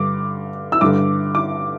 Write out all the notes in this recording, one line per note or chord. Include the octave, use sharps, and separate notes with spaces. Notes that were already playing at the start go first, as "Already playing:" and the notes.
Already playing: G2 D3 D6
E6
G2 D3 D6
D6